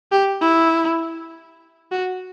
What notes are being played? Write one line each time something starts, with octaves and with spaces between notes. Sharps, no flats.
G4
E4
F#4